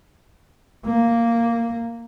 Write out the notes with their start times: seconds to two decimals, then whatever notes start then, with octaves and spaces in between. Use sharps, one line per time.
0.86 A#3